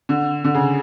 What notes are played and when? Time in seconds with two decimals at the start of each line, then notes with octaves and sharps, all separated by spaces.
0.09 D3
0.44 D3
0.55 C#3